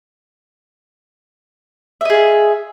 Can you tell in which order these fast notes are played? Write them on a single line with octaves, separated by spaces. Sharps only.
E5 D#5 G#4 F4